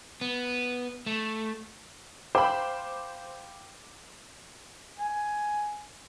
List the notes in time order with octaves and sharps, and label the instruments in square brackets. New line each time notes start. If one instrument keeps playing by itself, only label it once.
[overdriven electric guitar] B3
A3
[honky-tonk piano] C5 B5 [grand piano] F5 G5 D6
[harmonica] G#5